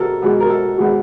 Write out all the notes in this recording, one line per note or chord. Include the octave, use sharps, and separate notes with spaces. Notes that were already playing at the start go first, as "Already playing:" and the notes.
Already playing: B2 A4 A#4
B2 G#3 B3
A#4
A4
B2 G#3 B3